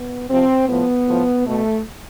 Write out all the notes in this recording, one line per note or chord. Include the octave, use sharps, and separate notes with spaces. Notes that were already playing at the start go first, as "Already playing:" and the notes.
Already playing: B3
C3 F3 C4
A2 F3 B3
A2 F3
B2 A3